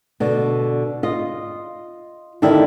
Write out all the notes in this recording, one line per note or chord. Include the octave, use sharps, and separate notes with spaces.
B2 D3
F4 D#5
D3 D#3 D4 E4 G4